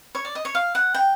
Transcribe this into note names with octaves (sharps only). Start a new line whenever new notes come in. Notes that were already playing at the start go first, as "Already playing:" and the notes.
C#5
D5
D#5
C#5
F5
F#5
G5